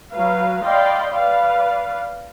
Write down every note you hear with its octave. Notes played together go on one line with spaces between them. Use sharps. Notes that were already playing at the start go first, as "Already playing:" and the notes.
F#3 B4 F5
D5 D#5 F5 G5 B5 C6
B4 D5 F5